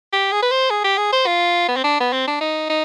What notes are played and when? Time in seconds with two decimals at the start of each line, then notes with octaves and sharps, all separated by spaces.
0.13 G4
0.32 G#4
0.42 B4
0.51 C5
0.70 G#4
0.84 G4
0.98 G#4
1.12 C5
1.27 F4
1.68 B3
1.76 C4
1.84 D4
2.00 B3
2.13 C4
2.27 D4
2.41 D#4
2.69 D#4